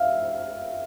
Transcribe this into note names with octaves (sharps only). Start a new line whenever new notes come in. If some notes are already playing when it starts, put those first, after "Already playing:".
Already playing: E5 F5